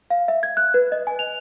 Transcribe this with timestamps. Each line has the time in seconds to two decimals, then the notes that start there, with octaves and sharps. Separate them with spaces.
0.10 F5
0.28 E5
0.43 G#6
0.57 F#6
0.74 B4
0.92 D#5
1.07 G#5
1.19 F7